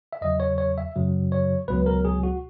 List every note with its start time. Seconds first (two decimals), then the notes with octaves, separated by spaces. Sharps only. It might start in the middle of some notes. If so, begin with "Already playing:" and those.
0.13 E5
0.21 E2 C#3 F#3 D#5
0.40 C#5
0.58 C#5
0.78 E5
0.96 F#2 C#3 F#3
1.32 C#5
1.68 C#2 B2 F#3 B4
1.86 A#4
2.05 G#4
2.23 F#4